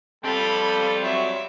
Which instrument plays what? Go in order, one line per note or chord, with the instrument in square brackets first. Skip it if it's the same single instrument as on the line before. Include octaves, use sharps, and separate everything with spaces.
[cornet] G3 [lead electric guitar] C4 F4 [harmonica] A4 G5 A5 [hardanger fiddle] B5
[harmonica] F#3 C#5 [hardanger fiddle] E5